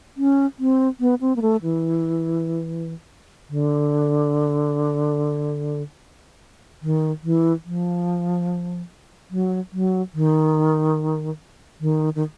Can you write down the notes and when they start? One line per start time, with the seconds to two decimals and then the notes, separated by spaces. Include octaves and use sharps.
0.17 C#4
0.59 C4
1.00 B3
1.21 C4
1.36 A#3
1.42 A3
1.63 E3
3.50 D3
6.82 D#3
7.23 E3
7.65 F3
9.31 F#3
9.73 F#3
10.14 D#3
11.81 D#3
12.15 D#3